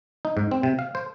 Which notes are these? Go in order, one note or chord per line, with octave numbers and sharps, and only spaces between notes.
D#4
G#2
C4
C3
F5
C5